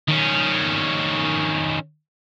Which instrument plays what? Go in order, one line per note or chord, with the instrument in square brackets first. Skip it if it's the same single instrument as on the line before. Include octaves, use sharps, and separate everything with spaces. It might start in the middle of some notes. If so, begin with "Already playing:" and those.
[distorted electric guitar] D#3 C#4